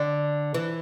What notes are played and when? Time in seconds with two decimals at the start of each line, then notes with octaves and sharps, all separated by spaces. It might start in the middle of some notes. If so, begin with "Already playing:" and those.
Already playing: D3
0.54 E3